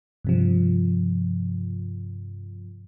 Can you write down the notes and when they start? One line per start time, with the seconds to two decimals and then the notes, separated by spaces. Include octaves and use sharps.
0.25 G2 C3 F3